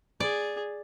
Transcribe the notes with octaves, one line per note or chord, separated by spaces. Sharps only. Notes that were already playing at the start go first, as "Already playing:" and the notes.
G#4 D5